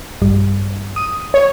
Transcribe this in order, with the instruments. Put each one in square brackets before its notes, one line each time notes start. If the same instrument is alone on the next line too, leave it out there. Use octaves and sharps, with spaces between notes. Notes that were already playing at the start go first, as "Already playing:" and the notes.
[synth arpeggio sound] A#1 G2 G3
D#6 D#7
[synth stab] C#5